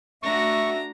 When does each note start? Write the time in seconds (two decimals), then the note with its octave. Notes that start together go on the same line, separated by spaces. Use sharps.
0.23 A3 D4 F#4 E5 A#5 C#6